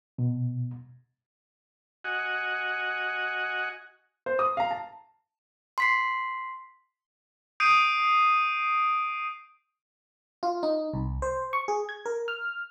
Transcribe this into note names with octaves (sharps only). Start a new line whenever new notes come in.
B2
F#4 D#5 F#5 G#5
C5
D#6
F5 A#5
A5
C6 B6 C7
D#6 G6 C7 D7 D#7
F4
D#4
C2
C5
C#6
G#4
G#6
A#4
F6